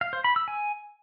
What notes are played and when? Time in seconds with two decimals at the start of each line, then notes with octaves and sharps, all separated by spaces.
0.01 F5
0.13 C5
0.24 B5
0.36 E6
0.48 G#5